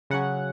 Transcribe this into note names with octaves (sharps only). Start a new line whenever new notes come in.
C#3 F#3 C#4 F#5